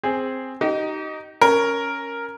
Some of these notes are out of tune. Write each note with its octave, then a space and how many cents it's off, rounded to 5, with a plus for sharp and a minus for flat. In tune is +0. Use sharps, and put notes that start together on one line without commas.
C4 +0 G#4 +0
D#4 +0 G4 -40
C#4 +0 A#4 +0